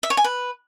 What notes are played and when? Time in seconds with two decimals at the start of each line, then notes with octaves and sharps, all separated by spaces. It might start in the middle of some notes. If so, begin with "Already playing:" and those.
0.03 E5
0.10 C#5
0.17 G#5
0.24 B4